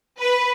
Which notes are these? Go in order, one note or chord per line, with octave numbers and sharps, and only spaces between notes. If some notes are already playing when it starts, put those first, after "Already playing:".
B4